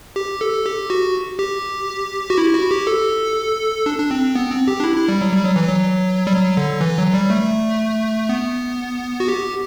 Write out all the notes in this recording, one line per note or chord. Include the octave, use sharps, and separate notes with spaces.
G4
A4
G4
F#4
G4
F#4
E4
F#4
G4
A4
D4
D4
C4
B3
C4
G4
D4
E4
E4
G3
F#3
G3
F#3
E3
F#3
G3
F#3
D3
E3
F#3
G3
A3
B3
F#4
G4